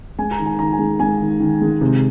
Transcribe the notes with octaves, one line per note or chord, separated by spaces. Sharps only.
G#3 G#5
A#5
D#3
G#5
D#3 A#5
G#5
G#3
G#3 G#5
D#3
D#3
G#3
C3